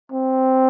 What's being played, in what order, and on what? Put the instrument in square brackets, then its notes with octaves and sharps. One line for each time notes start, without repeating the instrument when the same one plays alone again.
[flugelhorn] C4